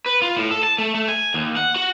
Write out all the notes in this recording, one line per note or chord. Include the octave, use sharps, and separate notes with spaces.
B4
F4
A2
A4
A5
A3
A3
G#5
D#2
F#5
F#4